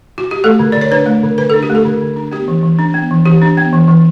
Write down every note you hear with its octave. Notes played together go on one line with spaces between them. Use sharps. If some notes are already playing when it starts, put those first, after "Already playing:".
F#4
G4
A3 A4
D3
D3 D5
C#5
D4 B4
A3
D3
D3 B4
D4 A4
G4
A3
A4
D3
D3
D4
B3 G4
E3
E3
D4
B3
E3
E3 G4
D4
B3
E3
E3